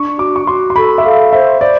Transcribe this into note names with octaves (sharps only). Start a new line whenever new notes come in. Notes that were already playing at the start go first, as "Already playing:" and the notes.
Already playing: D4 C#6
F#4 D6
C#6
F#4 C6
C6
A4 B5
E5
A4 F5
C5 E5
C5 D5